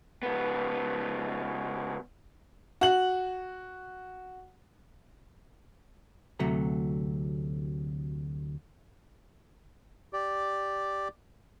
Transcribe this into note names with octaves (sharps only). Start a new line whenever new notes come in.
C#2 B3
F#4 F#7
D2 C3 F#3 A3 A#5
G4 D5